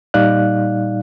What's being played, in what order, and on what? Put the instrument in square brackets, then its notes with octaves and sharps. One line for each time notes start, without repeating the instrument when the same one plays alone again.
[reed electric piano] A#2 G3 D#4 D5 F5 F#6